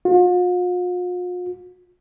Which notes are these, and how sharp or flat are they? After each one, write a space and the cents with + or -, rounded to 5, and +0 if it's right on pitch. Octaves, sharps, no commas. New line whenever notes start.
F4 +45